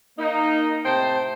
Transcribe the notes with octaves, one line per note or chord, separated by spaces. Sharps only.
A#3 D#4
A2 C3 C5 G5 A5